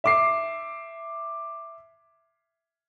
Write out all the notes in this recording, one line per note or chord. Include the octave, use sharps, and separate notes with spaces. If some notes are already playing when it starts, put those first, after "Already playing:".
E5 D6 C7